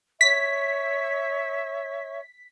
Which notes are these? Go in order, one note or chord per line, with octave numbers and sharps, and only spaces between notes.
C#5 E5 C#6 B6